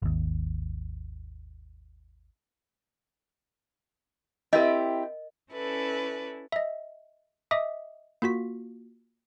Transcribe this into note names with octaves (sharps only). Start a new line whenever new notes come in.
G#1 D#2
C4 E4 G4 A#4 D#5
C#4 E4 A4 B4 D5
D#5 E5
D#5 E5 D6 D#6
A#3 F4 F#4 B6